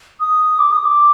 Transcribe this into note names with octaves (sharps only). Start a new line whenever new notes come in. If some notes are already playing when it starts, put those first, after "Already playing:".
D#6
D6
D#6
D6